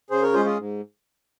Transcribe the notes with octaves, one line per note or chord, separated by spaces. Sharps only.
C#3 G#4 C5
A#4 C#5
G#3 C#4 F4 G#4 C5
F4 G#4
G#2